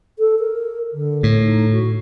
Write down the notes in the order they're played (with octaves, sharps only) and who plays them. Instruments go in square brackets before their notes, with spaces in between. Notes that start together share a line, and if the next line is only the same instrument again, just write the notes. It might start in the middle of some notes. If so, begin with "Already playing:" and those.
[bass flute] A4
A#4
D3
[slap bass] A2
[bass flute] D#4
F#4